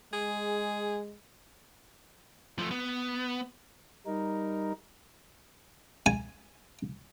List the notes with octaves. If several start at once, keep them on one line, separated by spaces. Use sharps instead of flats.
G#3 G#4
F3 A3
B3
G3 D#4 A#4
G#5